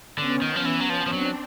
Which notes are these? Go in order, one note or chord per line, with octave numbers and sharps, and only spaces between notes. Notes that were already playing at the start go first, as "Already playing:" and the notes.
D3 B3 C#4
D#3
F3
E3
F#3
F3
F3
F#3 C4 D4